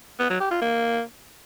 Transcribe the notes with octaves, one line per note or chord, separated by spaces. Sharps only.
B3
F#3
G4
F4
A#3